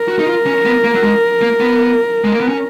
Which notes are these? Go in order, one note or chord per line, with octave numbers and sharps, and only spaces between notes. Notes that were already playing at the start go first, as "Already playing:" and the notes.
Already playing: A#4
F#4
D#4
F4
C#4
B3
A#3
F#3
G#3
A#3
B3
G#3
A#3
B3
C#4